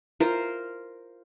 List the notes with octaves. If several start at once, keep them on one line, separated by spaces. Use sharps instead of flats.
F4 A#4 C5